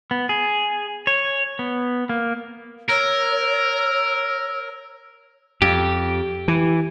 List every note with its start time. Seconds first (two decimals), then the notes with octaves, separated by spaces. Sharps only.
0.11 B3
0.29 G#4
1.07 C#5
1.59 B3
2.09 A#3
2.89 A#4 C#5 E6
5.62 F2 G4
6.48 E3